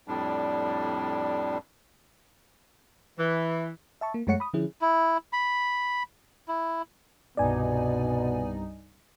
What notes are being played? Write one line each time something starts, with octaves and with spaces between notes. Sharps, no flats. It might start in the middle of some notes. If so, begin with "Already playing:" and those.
F2 A2 G3 D4
E3
E5 A5 C#6
A#3
F#2 G#3 A3 C#5 F#5 C#7
B5 D#6
D3 F3 C#4 E4 G#4
E4
B5
E4
C2 G2 B2 B3 D#4 D5 G#5